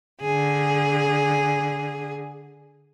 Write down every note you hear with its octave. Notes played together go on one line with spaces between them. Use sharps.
D3 G#4